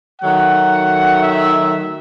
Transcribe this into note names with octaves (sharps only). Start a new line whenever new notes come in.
D#3 F#3 A3 F#5
E5